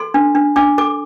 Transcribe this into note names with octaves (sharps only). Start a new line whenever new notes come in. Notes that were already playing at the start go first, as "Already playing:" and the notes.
Already playing: A4 C6
D4
D4
D4 D6
A4 D6